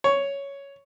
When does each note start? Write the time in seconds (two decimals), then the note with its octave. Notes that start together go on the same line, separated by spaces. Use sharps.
0.04 C#5